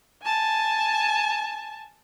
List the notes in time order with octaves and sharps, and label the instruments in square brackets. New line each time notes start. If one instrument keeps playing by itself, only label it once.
[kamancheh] G#5 A5